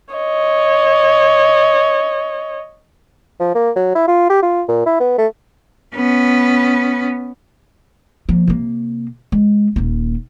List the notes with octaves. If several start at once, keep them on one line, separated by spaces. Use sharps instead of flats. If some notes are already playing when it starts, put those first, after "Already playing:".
C#5 D#5
F3
A#3
F#3
E4
F4
G4
F4
A#2
E4
B3
A3
B3 C#4
F3 A#3
C3 A#3
G#3
D#1 A#3